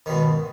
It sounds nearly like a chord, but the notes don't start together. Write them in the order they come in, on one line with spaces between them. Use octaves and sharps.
D#3 B2 G#2